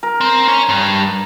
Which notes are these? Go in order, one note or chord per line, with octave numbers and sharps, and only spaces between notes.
A#4
C4
C#4
G2